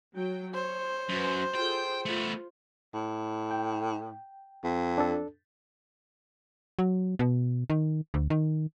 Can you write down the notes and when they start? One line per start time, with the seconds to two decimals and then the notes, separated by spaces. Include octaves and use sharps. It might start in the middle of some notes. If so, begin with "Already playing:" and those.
0.17 F#3 G5
0.54 C5 C#5
1.09 F#2 F#4 B4
1.55 F4 G#4 A4 G5
2.06 A3 B3 F4
2.93 A2
3.51 G5
4.64 F2
4.98 D4 A4
6.79 F#3
7.19 B2
7.70 D#3
8.14 D2
8.30 D#3